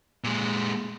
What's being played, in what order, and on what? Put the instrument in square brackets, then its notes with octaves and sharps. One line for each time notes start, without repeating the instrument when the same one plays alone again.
[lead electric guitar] A#2 G#3